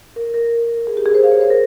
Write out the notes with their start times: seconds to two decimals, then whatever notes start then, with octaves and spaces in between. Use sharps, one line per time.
0.16 A#4
0.34 A#4
0.78 A#4
0.87 G#4
0.97 G4
1.06 G#4
1.14 C5
1.23 F5
1.32 C#5
1.41 C5
1.50 A#4